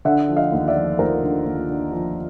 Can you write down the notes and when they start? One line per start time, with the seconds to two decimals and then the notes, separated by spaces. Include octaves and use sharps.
0.05 D3 E5 F#5
0.29 F3
0.36 D#5 F5
0.52 D#2
0.68 D5 E5
0.76 F3
0.99 D#2 A#4 C5
1.22 D3
1.46 D#2
1.69 D3
1.92 F3